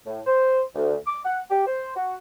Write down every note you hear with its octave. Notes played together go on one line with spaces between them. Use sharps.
A2
C5
D2
D6
F#5
G4
C5
F#4